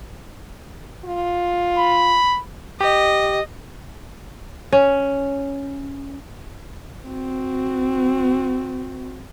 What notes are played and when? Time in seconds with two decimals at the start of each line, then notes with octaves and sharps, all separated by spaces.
1.05 F4
1.79 B5
2.81 G4 D#5
4.73 C#4
7.06 C4 F#4